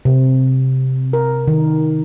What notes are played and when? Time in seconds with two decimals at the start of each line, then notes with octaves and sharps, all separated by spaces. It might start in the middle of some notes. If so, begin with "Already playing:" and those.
0.05 C3
1.13 A#4
1.48 D#3